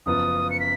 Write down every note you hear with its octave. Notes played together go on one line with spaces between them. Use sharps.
F#1 F#2 F3 B3 F4 D#6
C#7
B6